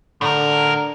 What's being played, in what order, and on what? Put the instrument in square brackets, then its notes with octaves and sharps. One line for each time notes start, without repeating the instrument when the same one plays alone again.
[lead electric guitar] A2 A#4 [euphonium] D3